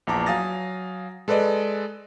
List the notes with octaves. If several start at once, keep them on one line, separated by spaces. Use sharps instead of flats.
A#1 E2 A5 A#5 D6
F#3 F5 G#5 D#6 A6 A#6
G#3 A4 B4 D5 D#5